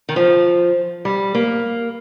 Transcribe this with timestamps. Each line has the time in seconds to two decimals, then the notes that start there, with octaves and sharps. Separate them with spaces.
0.09 D#3
0.16 F3
1.05 G3
1.35 A#3